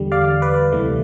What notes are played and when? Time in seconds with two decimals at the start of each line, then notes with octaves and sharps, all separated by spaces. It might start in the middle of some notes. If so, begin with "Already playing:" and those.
Already playing: E2 D3 G3
0.12 D5 F5
0.42 B4 D5
0.72 D2 C3 E3 A3